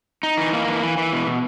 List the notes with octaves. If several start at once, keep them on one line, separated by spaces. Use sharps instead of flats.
D#4
E3
A#3
E3
E3
E3
B2
B2